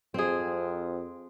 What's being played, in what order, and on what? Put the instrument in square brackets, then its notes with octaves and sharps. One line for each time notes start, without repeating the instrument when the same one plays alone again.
[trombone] F2 [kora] C4 G#4